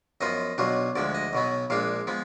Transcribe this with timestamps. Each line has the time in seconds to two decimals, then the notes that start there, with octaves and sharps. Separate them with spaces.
0.21 F#2 F3 B3 F4 D#5
0.58 B1 B2 F#3 D4 F4
0.96 D2 D3 F3 G#3 D5
1.15 D#5
1.33 B1 B2 F#3 B3
1.70 A#1 A#2 G#3 D4 F5
2.07 F3 G#3 B3